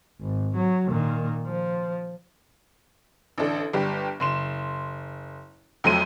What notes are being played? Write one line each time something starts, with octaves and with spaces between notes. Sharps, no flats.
G#1
F#3
A#2 D#3
F3
A1 D3 D4 A4
G1 G3 G4
F#1 C6 E7
F2 F#3 A3 C5 D#7